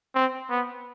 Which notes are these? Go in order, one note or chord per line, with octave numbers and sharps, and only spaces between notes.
C4
B3